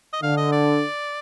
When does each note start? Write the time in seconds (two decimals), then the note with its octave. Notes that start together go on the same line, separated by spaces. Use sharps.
0.13 D#5
0.22 D3 F5
0.37 D#5
0.52 D5